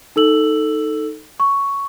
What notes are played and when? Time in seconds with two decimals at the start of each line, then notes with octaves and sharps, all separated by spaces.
0.16 D#4 A4 E6 F#7
1.40 C#6